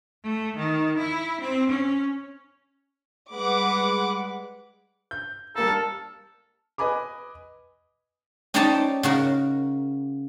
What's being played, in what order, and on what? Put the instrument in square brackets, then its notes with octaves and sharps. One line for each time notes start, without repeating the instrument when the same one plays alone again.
[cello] A3
D#3
E4
C4
C#4
[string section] G3 G#3 B4 F#5 D6
[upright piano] G6
[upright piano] G3 A#3 A#5 [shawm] A4
[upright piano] A5 F6 C#7
[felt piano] B4 D#5 G#5 B5 D6
[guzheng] C#4 D#4 G4 C5 D5 A5
C#3 F#4 A#4